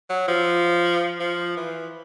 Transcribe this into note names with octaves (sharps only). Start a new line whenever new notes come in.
F#3
F3
F3
E3